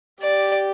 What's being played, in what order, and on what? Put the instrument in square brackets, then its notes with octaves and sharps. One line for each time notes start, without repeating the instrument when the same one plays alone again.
[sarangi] G4 [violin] D5